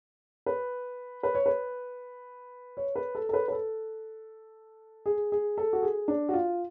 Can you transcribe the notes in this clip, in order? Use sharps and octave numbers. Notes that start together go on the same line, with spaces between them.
B4
B4
C#5
B4
C#5
B4
A4
A4
B4
B4
A4
G#4
G#4
A4
F#4
G#4
D4
F#4
F4